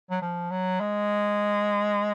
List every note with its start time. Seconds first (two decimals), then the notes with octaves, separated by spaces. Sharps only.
0.11 F#3
0.22 F3
0.51 F#3
0.80 G#3